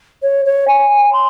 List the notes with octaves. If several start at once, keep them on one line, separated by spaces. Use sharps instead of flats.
C#5
C#5
G#5
C6